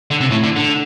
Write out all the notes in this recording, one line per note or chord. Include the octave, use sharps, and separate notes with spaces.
D3
C3
A2
D3
D3